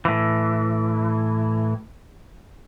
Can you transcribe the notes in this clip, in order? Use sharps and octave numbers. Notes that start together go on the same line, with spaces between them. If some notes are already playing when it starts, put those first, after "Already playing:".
A2 E3